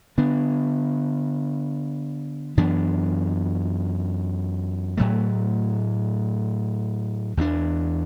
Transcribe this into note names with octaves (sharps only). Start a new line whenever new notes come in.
D3 B3 D4
F#2 E3 B3 D4
A2 F#3 A3
E2 E3 B3 D4